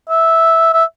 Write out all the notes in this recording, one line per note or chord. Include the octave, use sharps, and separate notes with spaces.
E5
E5